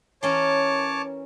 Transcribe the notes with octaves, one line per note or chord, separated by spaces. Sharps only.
E3 C#4 A#4 C#5 A5 D6